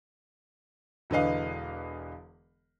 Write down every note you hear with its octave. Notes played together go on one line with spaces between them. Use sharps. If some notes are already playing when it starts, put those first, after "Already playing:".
E1 D3 E3 B4 D#5 F5